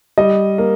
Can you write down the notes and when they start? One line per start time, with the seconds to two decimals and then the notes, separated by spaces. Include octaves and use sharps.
0.18 G3 D#5
0.58 A#3